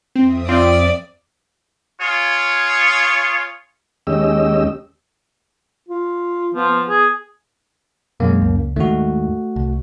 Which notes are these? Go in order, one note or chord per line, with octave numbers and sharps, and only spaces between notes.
F2 C4 E5 D#6
C4 F4 D5
F4 G#4 C#5
D#2 G#3 C#4 G4 D#5 E6
F4
F3 B3
B3
G#4
F#2 B2 G#3 A#3
C#2
D#2 G#2 D#3 A3 F#4
C2